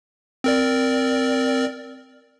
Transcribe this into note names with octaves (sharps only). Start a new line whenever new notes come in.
C4 A#4 D5